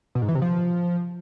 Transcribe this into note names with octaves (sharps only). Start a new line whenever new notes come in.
B2
G#2
E3
C3
F3